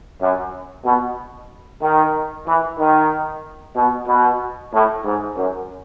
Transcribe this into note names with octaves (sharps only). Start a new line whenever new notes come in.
F#2
B2
D#3
E3
D#3
B2
B2
A2
G#2
F#2